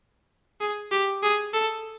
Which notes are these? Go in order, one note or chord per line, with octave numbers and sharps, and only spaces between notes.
G#4
G4
G#4
A4